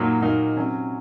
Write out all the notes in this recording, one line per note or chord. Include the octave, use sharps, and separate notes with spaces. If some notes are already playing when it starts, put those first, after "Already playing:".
Already playing: A#2 F#3 A#3 D#4
A#2 F#3 A#3 D#4
C3 F#3 C#4